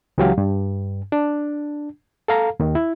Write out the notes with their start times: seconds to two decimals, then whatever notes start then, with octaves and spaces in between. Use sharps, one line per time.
0.18 C#2 E3 F#3 G4 F5
0.38 G2
1.12 D4
2.28 A4 F5 A#5
2.60 D#2 D#3
2.75 E4